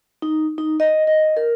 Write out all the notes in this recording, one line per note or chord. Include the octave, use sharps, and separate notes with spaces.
D#4
D#4
D#5
D#5
A#4